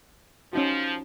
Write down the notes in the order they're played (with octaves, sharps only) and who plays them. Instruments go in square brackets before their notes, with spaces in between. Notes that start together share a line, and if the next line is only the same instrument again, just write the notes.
[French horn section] F3 [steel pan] C#4 D#4 F#4